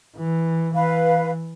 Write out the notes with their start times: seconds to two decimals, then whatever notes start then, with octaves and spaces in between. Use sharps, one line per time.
0.17 E3
0.74 E3 B4 F5